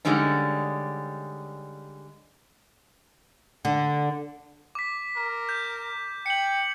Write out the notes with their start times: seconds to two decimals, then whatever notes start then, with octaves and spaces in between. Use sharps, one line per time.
0.05 D3 G3 G#3 C#4 D#4
3.65 D3
4.75 D6 B6
5.16 A#4
5.49 G6
6.26 G5 C#7 F#7